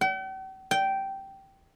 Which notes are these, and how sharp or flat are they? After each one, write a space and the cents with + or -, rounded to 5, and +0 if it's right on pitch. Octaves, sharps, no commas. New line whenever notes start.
G5 -45
G5 -10